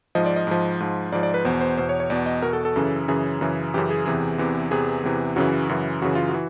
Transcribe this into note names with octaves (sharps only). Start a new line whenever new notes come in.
G#2 F3 D#5
D5
D#5
G#2 F3
G#2 F3
G#2 F3 D5
D5
B4
E2 B2 C5
C5
E2 B2 C5
C#5
C#5
E2 B2 D5
D#5
E2 B2 A#4
A4
A4
F#2 C#3 E3
F#2 C#3 E3 G#4
F#2 C#3 E3
F#2 C#3 E3 G4
G#4
E2 C3 E3 G#4
E2 C3 E3
E2 C3 E3 G#4
E2 C3 E3
F#2 C#3 E3 F#4
F#2 C#3 E3
F#2 C#3 E3 F#4
F4
F#4
E3